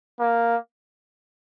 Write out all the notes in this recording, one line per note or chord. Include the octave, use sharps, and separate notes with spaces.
A#3